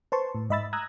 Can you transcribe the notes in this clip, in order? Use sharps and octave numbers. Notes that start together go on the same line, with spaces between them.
B4 C5 A5 C6 C#6
A2
G#2 D#5 E5 B5 E6 A6
A#5 D#6 E6 F#6 G#6 A#6